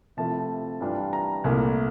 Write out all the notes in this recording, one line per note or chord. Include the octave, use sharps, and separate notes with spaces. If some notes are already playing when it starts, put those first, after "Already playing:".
C3 F3 A3 E4 A5
G2 E3 G3 D4 F4
A#5
C2 A#2 A3 E4